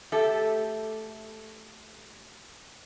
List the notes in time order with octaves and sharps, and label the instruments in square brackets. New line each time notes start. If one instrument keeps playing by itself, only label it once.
[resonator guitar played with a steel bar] A3 G4 A4 E5